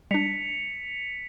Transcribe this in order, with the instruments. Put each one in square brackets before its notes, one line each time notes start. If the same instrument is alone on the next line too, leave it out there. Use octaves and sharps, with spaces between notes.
[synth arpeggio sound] G3 D4 [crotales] B6 C#7 F7